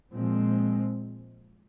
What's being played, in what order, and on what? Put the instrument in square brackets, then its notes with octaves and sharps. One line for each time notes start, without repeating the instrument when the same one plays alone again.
[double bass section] A#2 F3 G#3 C4